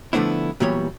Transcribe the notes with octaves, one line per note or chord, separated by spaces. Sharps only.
D3 F3 A3 B3 D4 E4
A#2 E3 F#3 G3 B3 C#5